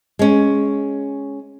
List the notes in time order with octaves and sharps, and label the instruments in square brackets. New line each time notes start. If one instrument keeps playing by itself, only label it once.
[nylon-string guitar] G#3 C#4